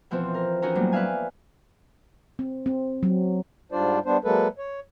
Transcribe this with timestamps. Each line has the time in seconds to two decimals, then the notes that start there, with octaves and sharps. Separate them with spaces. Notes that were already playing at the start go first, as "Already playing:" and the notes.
0.11 B2 E3 F3 B3 C4
0.34 A#4
0.62 E3 C#4 D#4 F#4 A#4 A#5
0.75 A2 F#3 G3 A#3 B3
0.92 B4 D5 E5 F5 G#5
2.39 C4
2.66 C4
3.03 F#3
3.72 G#2 G3 D4 F4 C5 D5
4.06 G3 B3 D4 C5
4.24 F#3 G#3 A#3 A4 B4
4.58 C#5